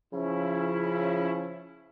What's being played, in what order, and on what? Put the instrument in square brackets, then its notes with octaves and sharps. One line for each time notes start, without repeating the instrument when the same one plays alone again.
[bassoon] C#3 [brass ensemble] F3 C#4 E4